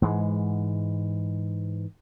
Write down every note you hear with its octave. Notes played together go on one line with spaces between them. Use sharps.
G#2 E3 G#3